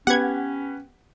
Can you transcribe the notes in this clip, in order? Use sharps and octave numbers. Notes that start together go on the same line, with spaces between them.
B3 C#4 G4 B4 F#5 G#6